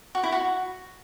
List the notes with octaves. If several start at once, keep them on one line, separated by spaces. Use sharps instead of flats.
F#4
E4
F#4